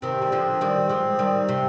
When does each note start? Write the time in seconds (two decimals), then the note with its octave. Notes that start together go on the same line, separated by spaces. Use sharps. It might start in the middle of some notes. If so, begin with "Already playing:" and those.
0.02 C3 D#3 C4
0.22 G3
0.32 D3 F3
0.61 D#3 G3
0.89 F3 G#3
1.19 D#3 G3
1.49 C3